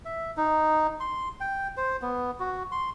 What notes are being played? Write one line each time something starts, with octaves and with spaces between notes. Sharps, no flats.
E5
D#4
C6
G5
C5
B3
F#4
C6